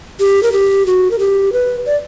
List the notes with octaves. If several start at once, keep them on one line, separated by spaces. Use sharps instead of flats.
G4
A#4
G4
F#4
A#4
G4
B4
D5